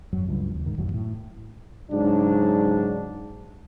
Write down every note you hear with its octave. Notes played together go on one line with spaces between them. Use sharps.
G#1 F#2 F#3
C#2 G2 F#3
D#2
G#2 D#3
D#1 A1 F#2 F#3
A2
G#2 C#3 F#3 D4